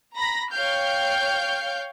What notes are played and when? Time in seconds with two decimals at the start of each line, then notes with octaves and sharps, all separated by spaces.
0.16 A#5 B5 A#6
0.52 C#5 F5 G5 F6 G6